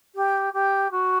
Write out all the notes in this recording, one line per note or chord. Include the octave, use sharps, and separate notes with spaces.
G4
G4
F#4